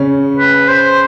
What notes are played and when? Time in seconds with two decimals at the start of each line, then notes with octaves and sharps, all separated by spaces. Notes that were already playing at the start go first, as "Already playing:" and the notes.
Already playing: C#3 C#4
0.37 B4
0.68 C5